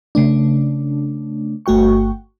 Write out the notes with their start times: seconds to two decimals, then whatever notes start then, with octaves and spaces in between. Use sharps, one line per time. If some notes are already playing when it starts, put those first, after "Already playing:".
0.15 C#3 A3 D4
1.66 G1 A3 F#4 G5 C#6